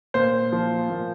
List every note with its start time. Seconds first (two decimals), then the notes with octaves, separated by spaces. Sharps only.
0.14 A#2 C5
0.52 F3
0.90 A#2